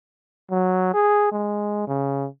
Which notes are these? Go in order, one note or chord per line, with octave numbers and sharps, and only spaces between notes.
F#3
G#4
G#3
C#3